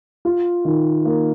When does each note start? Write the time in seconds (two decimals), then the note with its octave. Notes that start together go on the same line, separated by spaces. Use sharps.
0.25 F4
0.65 D#3
1.05 A#3